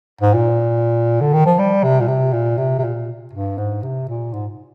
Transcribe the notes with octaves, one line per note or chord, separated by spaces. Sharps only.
G#2
A#2
D3
D#3
F3
G3
C3
A#2
C3
A#2
C3
C3
A#2
G2
G#2
C3
A#2
G#2